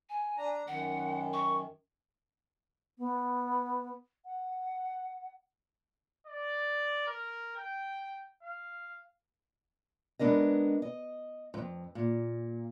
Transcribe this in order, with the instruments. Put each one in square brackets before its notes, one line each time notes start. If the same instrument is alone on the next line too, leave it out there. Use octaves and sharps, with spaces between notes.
[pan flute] G#5
[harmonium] D4 A#5
[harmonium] F#2 D#3 [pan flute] F#5
[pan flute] C#6
[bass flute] B3
F#5
[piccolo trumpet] D5
A#4
G5
F5
[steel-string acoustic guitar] G#3 B3 D4 A#4 D#5
D#5
F2 G#2
A#2